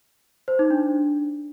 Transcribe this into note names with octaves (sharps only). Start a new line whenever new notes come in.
C5
D#4
D4